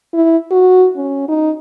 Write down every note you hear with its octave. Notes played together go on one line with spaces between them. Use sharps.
E4
F#4
C#4
D#4